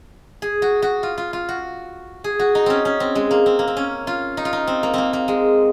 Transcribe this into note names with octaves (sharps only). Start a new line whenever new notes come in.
G#4
F#4
F#4
F4
F4
F4
F#4
G#4
F#4
D#4
C4 C#4
C#4
C4
G#3
A#3
C4
A#3
C4
C#4
F4
D#4
F4
D#4
C4
A#3
A#3 C4
A#3
G#3